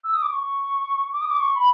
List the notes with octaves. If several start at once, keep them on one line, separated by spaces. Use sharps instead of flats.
E6
D#6
D6
C#6
D6
D#6
D6
C#6
B5